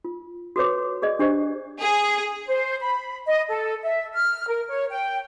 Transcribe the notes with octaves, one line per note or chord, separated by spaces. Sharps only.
F4
F#4 A4 B4 C#5 D6
G#4 D5 D#5
D4 G4 C5 D#5
G#4
C5
B5
D#5
A4
E5
F6
A#4
C#5
G5